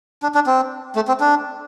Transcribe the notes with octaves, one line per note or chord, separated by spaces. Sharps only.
D4
D4
C4
A3
C4
D4